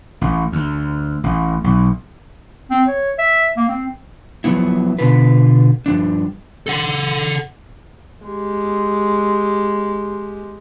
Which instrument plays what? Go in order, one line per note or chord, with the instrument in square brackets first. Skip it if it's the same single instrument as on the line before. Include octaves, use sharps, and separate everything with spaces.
[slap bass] A1
D2
A1
B1
[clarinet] C4
C#5
E5
A#3
C4
[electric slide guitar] F3 F#3 B3 E4
B2 D3 B3 F4 B4
G2 F3 D4
[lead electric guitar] A4 F#5
[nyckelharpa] G#3 G4